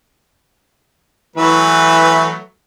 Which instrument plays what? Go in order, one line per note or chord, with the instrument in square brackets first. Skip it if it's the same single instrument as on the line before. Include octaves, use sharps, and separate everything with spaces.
[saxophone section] E3 [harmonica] F#3 A3 B4